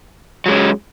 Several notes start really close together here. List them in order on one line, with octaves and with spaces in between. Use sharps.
F#3 G#3 C#4